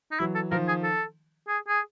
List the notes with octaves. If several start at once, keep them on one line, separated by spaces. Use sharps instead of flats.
D#4
E3 F#3 E4
A4
D#3 F3 A#4
G#4
A4
G#4
G#4